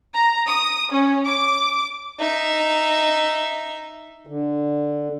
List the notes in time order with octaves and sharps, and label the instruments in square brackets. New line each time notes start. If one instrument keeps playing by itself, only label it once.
[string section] A#5
D#6
C#4
D6
[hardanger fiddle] D#4 E5
[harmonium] D3